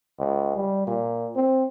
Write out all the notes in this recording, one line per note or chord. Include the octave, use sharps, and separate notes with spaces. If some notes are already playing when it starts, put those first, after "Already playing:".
C#2
G3
A#2
C4